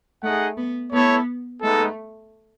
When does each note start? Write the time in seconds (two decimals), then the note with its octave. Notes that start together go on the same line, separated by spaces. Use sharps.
0.23 A3 D#4 G#4 D#5 F#5
0.57 B3
0.93 A3 B3 E4 A4 C#5
1.62 G#3 A3 B3 D#4 A4